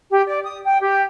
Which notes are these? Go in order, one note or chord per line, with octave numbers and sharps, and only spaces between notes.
G4
D5
D#6
G5
G4